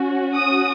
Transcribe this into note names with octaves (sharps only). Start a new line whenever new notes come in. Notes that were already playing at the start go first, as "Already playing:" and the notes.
Already playing: C#4 F#4
D#6